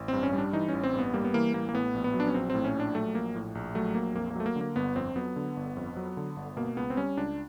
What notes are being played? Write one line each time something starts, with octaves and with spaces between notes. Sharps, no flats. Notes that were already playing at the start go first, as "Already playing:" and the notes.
Already playing: A1
G2 C4
C#4
G3
D4
E3 D#4
A1 C#4
C4
G2
B3
G3 A#3
B3
E3 A#3
A1 A#3
A#3
A2 B3
A#1
B3
F#3
D4
C#4
A#1 C4
C4
A2
C#4
A#1 D4
F#3 A3
A#1 A#3
A2
A#1
F#3 A3
A#1 A#3
F2 A#3
A#3
F#3 A3
A#3
D3
A#3
G1 B3
F2 C4
F#3 B3
D3
G1
F2
F#3
D3
G1
B2 A#3
C#2 B3
C4
G3 C#4
C#2 D4